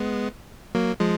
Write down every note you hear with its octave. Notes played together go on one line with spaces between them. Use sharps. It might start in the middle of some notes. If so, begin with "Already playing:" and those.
Already playing: G#3 B3
F#3 A#3
F3 G#3